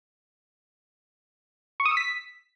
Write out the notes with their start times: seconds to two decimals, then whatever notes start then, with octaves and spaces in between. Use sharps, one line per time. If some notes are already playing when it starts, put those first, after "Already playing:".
1.80 C#6
1.85 D#6
1.91 E6
1.97 B6